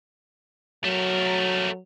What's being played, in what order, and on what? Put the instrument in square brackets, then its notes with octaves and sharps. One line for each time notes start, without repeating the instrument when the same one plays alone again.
[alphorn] F#3 [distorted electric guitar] A3 A#4